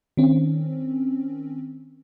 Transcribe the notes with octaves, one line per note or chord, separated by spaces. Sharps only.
D#3 C4 C#4